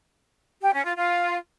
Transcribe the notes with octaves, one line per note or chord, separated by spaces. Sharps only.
G4
C#4
F4
F4